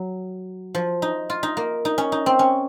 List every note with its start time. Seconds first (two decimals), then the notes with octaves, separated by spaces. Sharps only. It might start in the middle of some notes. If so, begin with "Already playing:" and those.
Already playing: F#3
0.75 F3
1.02 D#4
1.30 F4
1.43 D#4
1.57 A#3
1.85 D#4
1.98 C#4
2.12 D#4
2.26 C4
2.39 C#4